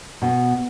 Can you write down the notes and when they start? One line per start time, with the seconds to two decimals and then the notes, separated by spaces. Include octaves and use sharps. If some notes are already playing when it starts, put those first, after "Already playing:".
0.22 B2